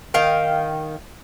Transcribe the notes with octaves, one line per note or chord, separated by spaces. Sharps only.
D#3 F5 G5